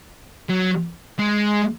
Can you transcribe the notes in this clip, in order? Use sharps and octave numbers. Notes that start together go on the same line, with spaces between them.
F#3
G#3